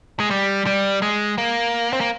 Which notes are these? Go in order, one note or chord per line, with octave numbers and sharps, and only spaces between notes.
G#3
G3
G3
G#3
A#3
C4
A#3